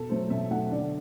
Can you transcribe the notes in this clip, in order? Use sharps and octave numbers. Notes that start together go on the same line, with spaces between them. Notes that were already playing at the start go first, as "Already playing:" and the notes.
Already playing: B2 A4
F#3 A3 C5
B2 E5
F#3 A3 F#5
D3 D5